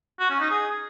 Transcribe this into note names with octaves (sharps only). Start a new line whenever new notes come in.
F#4
C#4
D#4
G#4